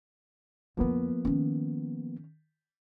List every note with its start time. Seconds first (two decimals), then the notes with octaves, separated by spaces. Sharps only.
0.77 F2 D3 F3 A#3 B3
1.25 D#3 C#4